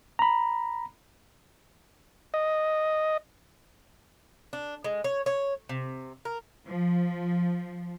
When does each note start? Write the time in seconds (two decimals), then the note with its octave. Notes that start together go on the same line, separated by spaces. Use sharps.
0.19 A#5 B5
2.34 D#5
4.53 D4
4.84 G#3
5.04 C#5
5.26 C#5
5.69 C3
6.25 A#4
6.67 F3